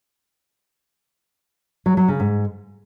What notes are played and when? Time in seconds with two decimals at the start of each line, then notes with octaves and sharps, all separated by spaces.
1.86 F#3
1.97 F#3
2.08 C#3
2.20 G#2